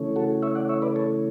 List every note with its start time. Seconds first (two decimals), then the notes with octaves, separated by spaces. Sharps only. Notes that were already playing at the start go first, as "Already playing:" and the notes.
Already playing: C#3 E3 A3 C#4
0.16 F#4 A4
0.43 C#5 E5
0.55 D5 F#5
0.69 C#5 E5
0.82 B4 D5
0.96 A4 C#5